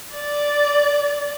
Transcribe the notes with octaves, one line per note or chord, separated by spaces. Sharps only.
D5